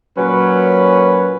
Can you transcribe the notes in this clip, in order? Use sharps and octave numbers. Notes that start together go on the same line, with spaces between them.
A#2 F#3 C#4 B4